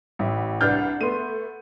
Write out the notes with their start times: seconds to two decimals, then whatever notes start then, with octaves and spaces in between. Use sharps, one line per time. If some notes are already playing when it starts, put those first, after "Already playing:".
0.19 A1 E4
0.61 C2 D4 B4 F6 G6 A6
1.01 A3 B3 C6 D#7